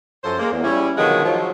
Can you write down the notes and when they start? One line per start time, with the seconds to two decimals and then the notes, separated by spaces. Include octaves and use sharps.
0.23 F#2 F3 A4 C5
0.39 G#3 A#3
0.51 E2
0.63 G3 C#4 E4
0.97 B2 D3 D#3 F3 F#3 G#3
1.24 F3 F#3